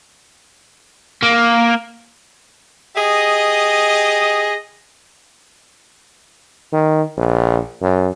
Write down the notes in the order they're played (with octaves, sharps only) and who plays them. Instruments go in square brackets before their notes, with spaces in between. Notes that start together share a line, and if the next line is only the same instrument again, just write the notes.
[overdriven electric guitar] A#3
[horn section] G4 G#4 D#5
[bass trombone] D#3
A#1
F#2